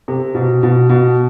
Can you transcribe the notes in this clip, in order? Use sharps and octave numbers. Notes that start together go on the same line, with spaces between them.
C3
B2
B2
B2